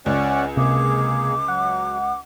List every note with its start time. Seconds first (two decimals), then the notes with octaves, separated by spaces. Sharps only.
0.06 C#2 C#4 D5 F#5 G#5
0.57 C3 A#3 G#4 D6
1.48 F#3 F#5